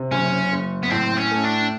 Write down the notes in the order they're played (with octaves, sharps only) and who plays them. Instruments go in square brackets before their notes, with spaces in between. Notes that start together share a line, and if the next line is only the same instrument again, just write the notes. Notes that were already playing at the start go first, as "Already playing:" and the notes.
Already playing: [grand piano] C3
[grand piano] F#1 [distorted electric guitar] C#4
[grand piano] F#1
[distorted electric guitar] B3
[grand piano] A2 [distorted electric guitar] C4
[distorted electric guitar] C#4
[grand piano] A3
[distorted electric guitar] D4